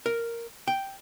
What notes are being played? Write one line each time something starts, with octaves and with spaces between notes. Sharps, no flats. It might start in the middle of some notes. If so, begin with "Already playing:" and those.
A#4
G5